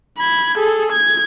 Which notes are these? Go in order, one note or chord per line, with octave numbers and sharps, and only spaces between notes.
B5 G#6
G#4 A4
G#6